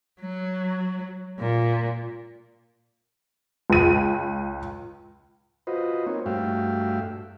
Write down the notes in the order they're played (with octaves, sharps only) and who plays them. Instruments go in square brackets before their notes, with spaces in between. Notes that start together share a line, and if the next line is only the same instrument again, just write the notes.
[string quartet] F#3
A#2
[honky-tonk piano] C#2 D#7
[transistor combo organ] F4 F#4 B4 C5 D#5
A#3 C4 D#4 C#5
G2 A3 F#4 E5 F5 G5